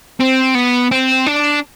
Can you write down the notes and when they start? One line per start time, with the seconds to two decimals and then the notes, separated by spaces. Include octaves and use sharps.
0.20 C4
0.55 B3
0.91 C4
1.26 D4